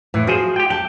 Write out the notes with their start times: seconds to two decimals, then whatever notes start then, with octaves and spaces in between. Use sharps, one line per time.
0.14 A2 E3
0.27 F3 F#4 G#4 C5
0.56 G4 G5
0.70 G5 A5